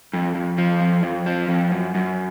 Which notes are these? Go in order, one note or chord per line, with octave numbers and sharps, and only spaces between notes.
F2
F2
F3
F2
F2
F3
F2
F#2
F#2